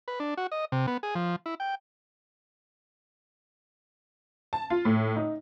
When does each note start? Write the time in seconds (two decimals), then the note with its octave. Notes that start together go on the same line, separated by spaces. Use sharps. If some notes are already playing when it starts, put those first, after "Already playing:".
0.08 B4
0.20 D4
0.37 F#4
0.52 D#5
0.72 C3
0.87 B3
1.03 G#4
1.15 F3
1.46 E4
1.60 G5
4.53 A5
4.70 F4
4.85 A2
5.16 D#4